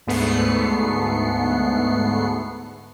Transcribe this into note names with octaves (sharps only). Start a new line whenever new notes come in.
D2 G#2 A3 B3 C7 C#7